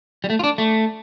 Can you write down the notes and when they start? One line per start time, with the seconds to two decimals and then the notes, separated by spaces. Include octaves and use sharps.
0.24 G3
0.30 A3
0.39 F4
0.44 D4
0.58 A3